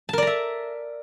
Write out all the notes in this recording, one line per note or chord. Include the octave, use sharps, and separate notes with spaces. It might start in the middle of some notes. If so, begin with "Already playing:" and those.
A#4 D5 E5 A5 A#5